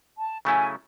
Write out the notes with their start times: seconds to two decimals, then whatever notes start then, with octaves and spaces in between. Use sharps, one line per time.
0.17 A5
0.45 C#3 F#3 A3 C#4 E4 G#5